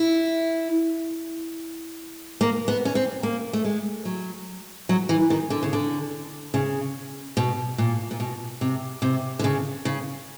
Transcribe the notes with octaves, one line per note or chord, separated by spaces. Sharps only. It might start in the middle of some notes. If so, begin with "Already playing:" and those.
Already playing: E4
A#3
B3
C#4
C4
A#3
A3
G#3
F#3
F#3
E3
D#3
D3
C#3
D3
C#3
B2
A#2
A#2
B2
C3
C3
D3
C#3
C#3